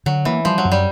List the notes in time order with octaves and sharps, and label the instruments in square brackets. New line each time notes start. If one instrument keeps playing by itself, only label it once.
[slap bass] D3 [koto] F#3
[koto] E3 [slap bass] A#3
[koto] F3 [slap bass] G3
[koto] F#3
[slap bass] F#2
[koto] G3